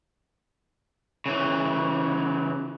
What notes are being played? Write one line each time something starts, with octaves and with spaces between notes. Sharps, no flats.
C#3 E3